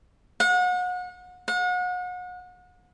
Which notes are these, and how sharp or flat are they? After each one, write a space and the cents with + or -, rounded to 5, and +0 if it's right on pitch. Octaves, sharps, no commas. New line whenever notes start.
F#5 -35
F#5 -35